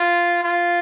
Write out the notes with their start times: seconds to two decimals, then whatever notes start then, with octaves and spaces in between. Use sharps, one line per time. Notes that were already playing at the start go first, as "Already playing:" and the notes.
Already playing: F4
0.44 F4